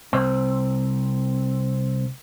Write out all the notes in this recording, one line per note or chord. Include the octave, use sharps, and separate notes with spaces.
C2 C4